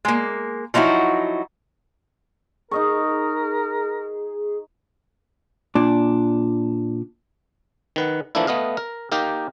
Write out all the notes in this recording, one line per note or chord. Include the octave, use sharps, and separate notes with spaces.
G#3 A#3
F3 F#3 D#4 E4 F#4
D#4 G#4 A#4 D#5 C#6
A#2 D4
D#3 B4 F#5
E3 F3 A3 A#3 D4 E4
A3 B3 D#5 F5
A#4
A#3 D#4 G4 A#4